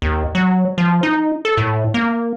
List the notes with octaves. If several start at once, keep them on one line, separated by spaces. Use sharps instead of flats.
D#2
F#3
F3
D#4
A4
A2
A#3